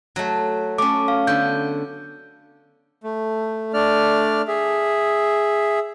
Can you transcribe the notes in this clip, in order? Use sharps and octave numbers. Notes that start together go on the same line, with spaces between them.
F#3 A3
A3 C#4 D6
F5
D3 B3 G6
A3
A3 D4 D5 F6
G#4 E5